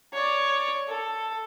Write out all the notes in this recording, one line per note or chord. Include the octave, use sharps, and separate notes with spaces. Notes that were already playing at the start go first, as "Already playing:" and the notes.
C#5 D5
A4